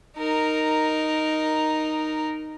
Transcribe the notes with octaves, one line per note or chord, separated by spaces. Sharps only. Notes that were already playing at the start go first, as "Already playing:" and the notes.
D#4 A#4